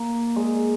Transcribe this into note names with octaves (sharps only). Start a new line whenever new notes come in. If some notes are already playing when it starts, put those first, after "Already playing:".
Already playing: A#3
G#3